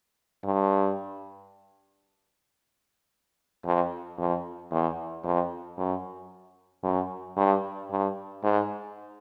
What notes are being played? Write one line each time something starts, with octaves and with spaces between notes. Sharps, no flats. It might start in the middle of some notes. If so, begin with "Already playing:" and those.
G2
F2
F2
E2
F2
F#2
F#2
G2
G2
G#2